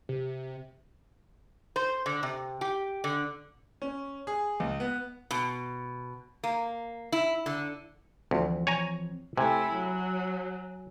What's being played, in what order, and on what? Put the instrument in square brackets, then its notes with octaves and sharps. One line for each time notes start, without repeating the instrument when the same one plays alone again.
[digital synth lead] C3
[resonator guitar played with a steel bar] C5
D3
C3
G4
D3
[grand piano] C#4
G#4
C#2
B3
[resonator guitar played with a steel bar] B2
A#3
E4
D3
[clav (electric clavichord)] D2 [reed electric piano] E3 F3 C4
[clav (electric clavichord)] C#5 G#5 A#5
[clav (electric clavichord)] C3 [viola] A3 E4 [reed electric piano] G#5 G#6
[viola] F#3